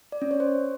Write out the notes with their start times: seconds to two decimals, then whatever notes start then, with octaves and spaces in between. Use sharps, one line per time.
0.12 D5
0.22 C#4
0.31 C#5
0.40 C5